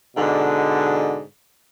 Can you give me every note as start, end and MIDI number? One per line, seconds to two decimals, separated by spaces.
0.17 1.22 44
0.17 1.22 47
0.17 1.22 50